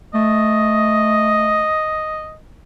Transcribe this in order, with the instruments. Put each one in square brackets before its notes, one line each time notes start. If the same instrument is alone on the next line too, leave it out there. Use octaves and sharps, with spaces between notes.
[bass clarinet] A3 [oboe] D#5